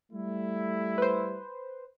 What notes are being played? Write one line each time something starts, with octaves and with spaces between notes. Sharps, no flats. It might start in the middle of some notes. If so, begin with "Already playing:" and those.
G3 A3 E4
B4 C5